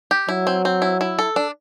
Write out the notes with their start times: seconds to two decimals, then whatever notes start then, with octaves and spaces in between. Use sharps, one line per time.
0.11 G4
0.29 F#3 E4
0.47 C4
0.65 C4
0.82 E4
1.01 E4
1.19 A4
1.36 D4